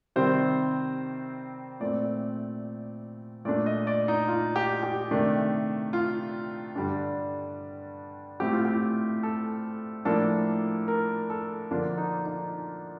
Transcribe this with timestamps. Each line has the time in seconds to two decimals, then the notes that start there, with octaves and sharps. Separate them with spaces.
0.16 C3 D#3 G3 C4 C5
1.80 A#2 A3 C4 D5
3.45 A#2 A3 D4 D5
3.66 D#5
3.87 D5
4.08 D#4
4.28 F4
4.56 G4
4.83 G4
5.11 C3 D#3 A3 D4
5.93 F4
6.75 G2 D3 G3 D4
8.40 A2 A3 C4 G4
8.53 F4
8.65 G4
9.23 A4
10.05 A2 F3 A#3 D4 A4
10.88 A#4
11.30 A4
11.71 D3 F3 A#3 D4 F4
11.98 D#4
12.26 D#4